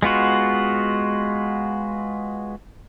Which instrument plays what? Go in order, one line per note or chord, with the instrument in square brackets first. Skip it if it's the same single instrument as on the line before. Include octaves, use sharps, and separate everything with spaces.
[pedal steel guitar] G#3 B3 F4 F#4